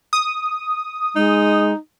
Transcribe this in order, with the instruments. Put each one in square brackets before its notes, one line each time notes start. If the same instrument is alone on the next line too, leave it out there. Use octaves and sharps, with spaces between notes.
[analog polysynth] D#6
[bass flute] G#3 [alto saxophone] D#4